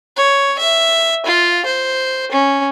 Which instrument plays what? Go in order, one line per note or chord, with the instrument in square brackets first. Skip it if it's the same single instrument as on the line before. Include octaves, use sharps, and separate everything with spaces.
[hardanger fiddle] C#5
E5
F4
C5
C#4